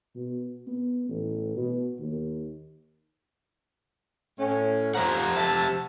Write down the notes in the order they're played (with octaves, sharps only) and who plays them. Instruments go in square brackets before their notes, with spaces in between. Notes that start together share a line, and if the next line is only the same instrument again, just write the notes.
[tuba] B2
B3
A1
B2
D#2
[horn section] A2 C#4
[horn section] F3 A#5 [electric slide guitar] G4 C5 F#5
[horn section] E5 A5